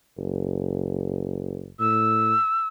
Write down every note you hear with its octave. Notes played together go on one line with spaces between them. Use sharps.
F#1
A2 E6